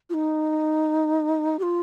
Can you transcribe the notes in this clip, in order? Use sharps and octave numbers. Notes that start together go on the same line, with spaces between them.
F4
D#4
G4
F4